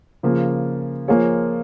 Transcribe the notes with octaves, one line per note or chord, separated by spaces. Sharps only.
C#3 F3 A#3
F3 A#3 F4 G#4 C#5